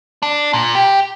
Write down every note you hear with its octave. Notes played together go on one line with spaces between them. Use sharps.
D4
A#2
G4